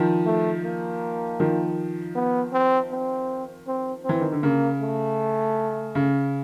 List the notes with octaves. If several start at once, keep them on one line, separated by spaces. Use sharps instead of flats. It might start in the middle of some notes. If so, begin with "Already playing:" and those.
Already playing: D#3 F3
A3
A#3
D#3 F3
B3
C4
C4
C4
E3 C4
D#3
D3
C#3 A#3
A3
C#3